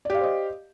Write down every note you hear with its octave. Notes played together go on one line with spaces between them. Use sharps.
G4 C5 D5 D#5 F5